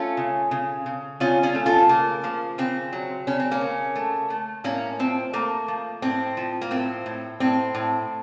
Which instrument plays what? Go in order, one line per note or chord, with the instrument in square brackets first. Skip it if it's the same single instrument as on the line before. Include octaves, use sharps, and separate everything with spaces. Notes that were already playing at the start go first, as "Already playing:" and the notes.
Already playing: [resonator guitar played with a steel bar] A3 C#4 F4
C#3
C#3
C#3
C#3 C#4 F4
C#4 F4
A3
F4 A4
C#3 A#3
F3 A#3
C#3 C4
F#3
C#3 C#4
C4
A#3 C#4
C#3
A3
A3
A2 A#3 C#4
F3 C4
A3 A#3
F3
A2 C4
F3
A#3
A2 C4
A2
A2 C4
A2